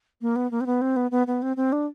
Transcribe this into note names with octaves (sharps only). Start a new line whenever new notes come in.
A#3
B3
A#3
C4
B3
C4
B3
B3
B3
C4
C4
D4